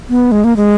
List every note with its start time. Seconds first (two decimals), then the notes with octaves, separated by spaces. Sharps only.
0.10 B3
0.32 G#3
0.44 A#3
0.57 G#3